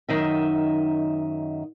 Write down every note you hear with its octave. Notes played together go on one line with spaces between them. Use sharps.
F#2 D#3 D#4 E5